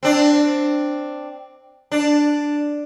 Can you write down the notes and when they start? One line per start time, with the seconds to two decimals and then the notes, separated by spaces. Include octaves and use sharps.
0.03 C4 D4
1.92 D4